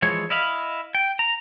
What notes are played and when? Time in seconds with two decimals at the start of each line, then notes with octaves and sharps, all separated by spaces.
0.02 E3 F3 G#3 C#5
0.30 E4 D#5 F5 B5
0.95 G5
1.19 A#5